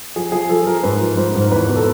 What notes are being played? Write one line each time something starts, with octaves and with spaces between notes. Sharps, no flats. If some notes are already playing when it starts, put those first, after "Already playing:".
F3 G#4
F3 G#4
F3 A4
F3 A#4
G#2 B4
F3
G#2 C5
G#2
A#4
E2 B4
B2
A4